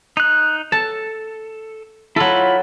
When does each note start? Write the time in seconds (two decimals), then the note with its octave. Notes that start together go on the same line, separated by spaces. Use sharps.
0.17 D#4 F#6
0.72 A4 A5
2.16 F#3 E4 F4 A4 B5